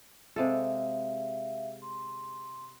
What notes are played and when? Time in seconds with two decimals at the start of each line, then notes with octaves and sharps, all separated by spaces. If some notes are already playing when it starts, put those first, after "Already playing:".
0.36 C3 G#3 A4 E5 F5
1.82 C6